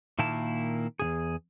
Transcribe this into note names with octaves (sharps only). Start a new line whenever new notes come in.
A#2 D#3 A#3 E4 A5
E2 C#3 G#4